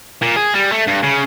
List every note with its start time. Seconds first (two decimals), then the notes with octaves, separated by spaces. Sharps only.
0.22 A#2
0.36 G#4
0.54 G3
0.72 A3
0.87 G2
1.03 C#3